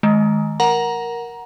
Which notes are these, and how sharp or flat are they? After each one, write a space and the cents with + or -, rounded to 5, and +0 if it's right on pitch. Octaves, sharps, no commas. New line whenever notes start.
D#3 +5 G#3 +25
A#4 +10 F#5 +0 A#5 +15